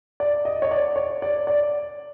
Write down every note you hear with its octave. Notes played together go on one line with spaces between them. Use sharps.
D5
D#5
C#5
D5
C#5
D5
D5